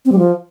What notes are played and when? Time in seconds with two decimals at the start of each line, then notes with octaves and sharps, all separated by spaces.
0.05 C4
0.12 G3
0.18 F3